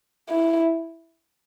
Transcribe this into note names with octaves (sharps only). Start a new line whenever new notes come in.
E4